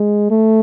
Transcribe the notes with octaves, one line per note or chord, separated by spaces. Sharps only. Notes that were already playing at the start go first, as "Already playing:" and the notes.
Already playing: G#3
A3